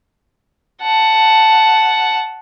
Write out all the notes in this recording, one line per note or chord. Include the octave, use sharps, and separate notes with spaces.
F#5 A5